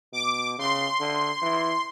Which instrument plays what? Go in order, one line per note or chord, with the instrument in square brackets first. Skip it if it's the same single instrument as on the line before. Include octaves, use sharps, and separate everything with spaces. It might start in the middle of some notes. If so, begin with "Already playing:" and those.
[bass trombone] B2 [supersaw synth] D6
[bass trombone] C#3 [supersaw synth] C6
[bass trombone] D3
E3